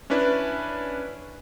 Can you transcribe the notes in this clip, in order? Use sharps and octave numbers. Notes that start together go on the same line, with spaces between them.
C#4 D4 E4 B4 D5